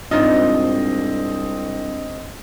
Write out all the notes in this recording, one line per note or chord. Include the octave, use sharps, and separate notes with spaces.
C2 G#2 C4 D4 F4 D#5